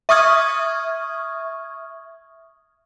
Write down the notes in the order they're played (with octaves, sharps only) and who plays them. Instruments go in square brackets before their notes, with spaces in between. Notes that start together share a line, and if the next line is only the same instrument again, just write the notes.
[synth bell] E5 C#6 D#6 F6 G#6